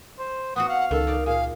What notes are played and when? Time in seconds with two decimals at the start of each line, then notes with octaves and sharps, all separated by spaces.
0.19 C5
0.56 B3 C4 F#4 F#5 D#6
0.69 F5 F#5
0.91 C#2 D#3 A4
1.07 D#4 D5
1.26 A#2 G#4 F5